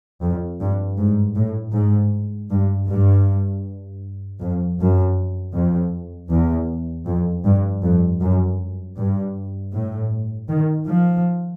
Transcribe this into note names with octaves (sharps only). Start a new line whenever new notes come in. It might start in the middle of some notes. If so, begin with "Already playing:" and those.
F2
G2
G#2
A2
G#2
G2
G2
F2
F#2
F2
E2
F2
G2
F2
F#2
G2
A2
D#3
F3